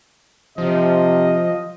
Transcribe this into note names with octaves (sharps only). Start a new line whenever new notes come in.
C3 F3 D#5